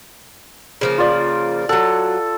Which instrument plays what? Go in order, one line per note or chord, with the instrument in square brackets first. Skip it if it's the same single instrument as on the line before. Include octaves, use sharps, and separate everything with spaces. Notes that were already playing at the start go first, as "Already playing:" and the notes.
[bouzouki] C#3 F3 A#3
[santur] F4 D5
[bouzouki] F#3 F#5 [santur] A4